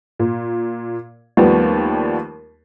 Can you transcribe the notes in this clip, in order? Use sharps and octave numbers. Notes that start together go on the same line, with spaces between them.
A#2
D#2 F3 G3 A3 B3